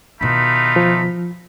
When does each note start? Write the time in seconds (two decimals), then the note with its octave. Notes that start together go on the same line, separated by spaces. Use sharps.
0.21 B2 D#3 A3 D#4 F4 B5
0.76 F3